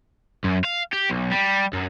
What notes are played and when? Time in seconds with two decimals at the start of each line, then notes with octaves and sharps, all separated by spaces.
0.44 F#2
0.64 F5
0.93 G4
1.10 B1
1.31 G3
1.73 F#2